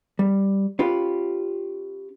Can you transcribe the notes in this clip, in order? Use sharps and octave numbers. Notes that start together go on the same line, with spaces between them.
G3
C#4 F4 G4 B4